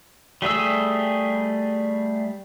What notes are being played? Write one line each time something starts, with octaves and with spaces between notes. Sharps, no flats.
G3 A3 G#4 E6